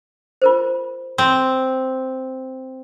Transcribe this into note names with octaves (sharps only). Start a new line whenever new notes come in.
F4 A#4 C5
C4